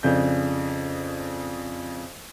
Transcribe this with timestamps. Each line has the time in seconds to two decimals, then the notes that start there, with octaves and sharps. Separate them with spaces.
0.03 F2 C#3 D4 G6